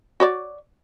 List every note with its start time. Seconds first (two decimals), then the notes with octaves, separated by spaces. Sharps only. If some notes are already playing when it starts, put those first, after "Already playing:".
0.20 F#4 C#5 D5